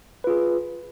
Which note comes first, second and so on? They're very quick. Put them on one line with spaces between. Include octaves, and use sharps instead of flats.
B4 F4 G#4